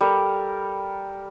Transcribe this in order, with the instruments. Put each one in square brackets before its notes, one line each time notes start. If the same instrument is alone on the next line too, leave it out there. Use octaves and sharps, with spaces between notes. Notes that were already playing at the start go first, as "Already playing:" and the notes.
[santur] G3 A4 A#4